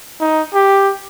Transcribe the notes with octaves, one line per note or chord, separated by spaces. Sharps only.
D#4
G4